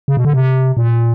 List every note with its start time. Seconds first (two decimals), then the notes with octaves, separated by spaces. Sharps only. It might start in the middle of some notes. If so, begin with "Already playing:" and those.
0.08 C#3
0.17 B2
0.25 D3
0.33 C3
0.77 A#2